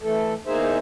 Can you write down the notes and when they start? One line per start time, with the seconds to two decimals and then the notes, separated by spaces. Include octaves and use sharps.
0.01 E3 A3 A4
0.46 E2 A#3 D#4 G#4 C5 E5